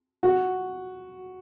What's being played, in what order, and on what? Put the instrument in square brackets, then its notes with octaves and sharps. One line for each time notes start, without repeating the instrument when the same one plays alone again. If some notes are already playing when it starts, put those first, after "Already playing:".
[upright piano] F#4